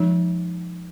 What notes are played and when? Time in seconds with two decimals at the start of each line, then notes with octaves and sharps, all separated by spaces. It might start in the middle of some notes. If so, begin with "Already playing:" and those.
Already playing: F3 G#3 D#4